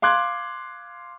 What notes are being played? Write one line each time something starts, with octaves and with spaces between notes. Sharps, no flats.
F5 C6 D6 F#6 G#6